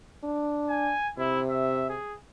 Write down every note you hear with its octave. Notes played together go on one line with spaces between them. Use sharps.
D4
G#5
C3 E4
E5
G#4